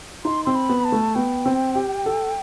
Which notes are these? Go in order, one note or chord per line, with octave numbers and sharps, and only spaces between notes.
D#4 C6
C4 C6
B5
B3
A5
A3
B3 G5
C4
G4
A4